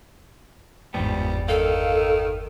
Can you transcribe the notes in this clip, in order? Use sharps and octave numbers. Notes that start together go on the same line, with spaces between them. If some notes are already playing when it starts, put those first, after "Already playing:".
G1 E2 G#2 G3 B3
D#3 A4 F5